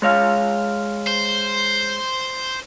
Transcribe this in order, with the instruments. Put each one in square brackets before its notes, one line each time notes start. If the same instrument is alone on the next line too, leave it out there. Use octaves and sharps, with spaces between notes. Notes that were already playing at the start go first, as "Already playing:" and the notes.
[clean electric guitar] G#3 C#5 F5
[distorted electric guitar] C5